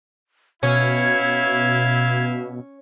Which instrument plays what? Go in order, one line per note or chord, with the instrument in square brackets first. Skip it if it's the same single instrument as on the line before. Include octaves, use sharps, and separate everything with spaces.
[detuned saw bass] B2 [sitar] C#4 [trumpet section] E4 E5 F5 [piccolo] G#6